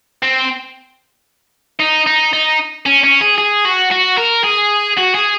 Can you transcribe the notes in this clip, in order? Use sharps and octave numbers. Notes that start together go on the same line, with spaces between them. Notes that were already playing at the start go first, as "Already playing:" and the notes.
C4
D#4
D#4
D#4
C#4
C#4
G#4
G#4
F#4
F#4
A#4
G#4
F#4
G#4